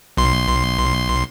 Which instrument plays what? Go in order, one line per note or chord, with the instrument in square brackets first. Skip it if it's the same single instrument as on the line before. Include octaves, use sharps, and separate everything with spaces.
[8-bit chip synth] B1 C6